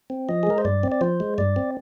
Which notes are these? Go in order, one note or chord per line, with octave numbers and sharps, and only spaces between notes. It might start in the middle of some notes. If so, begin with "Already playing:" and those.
C4
F3 D#5
G#4
G#3 A#4
C5
G2 D5
C4
D5
F3 C5
G#3
G2 D5
C4